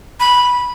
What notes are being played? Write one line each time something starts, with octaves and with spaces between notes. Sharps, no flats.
B5